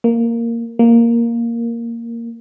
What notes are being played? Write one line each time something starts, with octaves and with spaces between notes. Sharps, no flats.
A#3
A#3